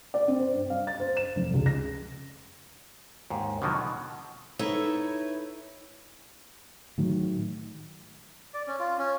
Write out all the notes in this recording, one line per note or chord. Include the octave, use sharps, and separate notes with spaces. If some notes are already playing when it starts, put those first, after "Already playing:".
D5
C4
C5
G2
F5
A6
C5
E7
F1
C#2
A#6
D#2 G#2
B2 D3 D#3 F3 F#3
B2
D#4 E4 A4 B4 C#5 E5
A2 D#3 F#3
D5
C#4
F4
C#4